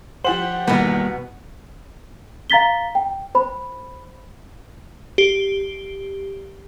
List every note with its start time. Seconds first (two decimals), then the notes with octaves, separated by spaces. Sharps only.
0.25 F3 G4 C5 F#5 F#7
0.67 E2 B2 D#3 G3 A#3 B3
2.50 F5 A#5 A6 B6 G7
2.95 G5
3.35 C5 B5
5.18 G4